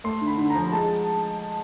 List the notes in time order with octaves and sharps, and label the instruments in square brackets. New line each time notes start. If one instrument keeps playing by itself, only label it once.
[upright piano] A3 C6
D3
B5
D3
A#5
F3
G#3 A5